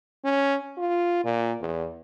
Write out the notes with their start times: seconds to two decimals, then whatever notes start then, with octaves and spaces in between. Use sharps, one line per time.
0.24 C#4
0.77 F4
1.25 A#2
1.60 E2